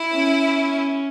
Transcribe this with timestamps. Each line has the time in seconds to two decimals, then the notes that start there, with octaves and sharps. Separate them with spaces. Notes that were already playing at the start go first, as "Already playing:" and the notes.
Already playing: E4
0.13 C#4